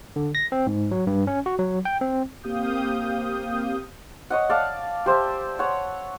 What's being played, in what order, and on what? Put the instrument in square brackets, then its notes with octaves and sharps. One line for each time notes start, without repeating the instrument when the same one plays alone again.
[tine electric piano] D3
A#6
C4
G#2
F#3
G2
C#4
F#4
F#3
G5
C4
[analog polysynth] A#3 C4 G4 F5 D#6 G6
[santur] C#5 D#5 F#5
D5 F5 A5
G4 C5 E5 A5
C#5 F#5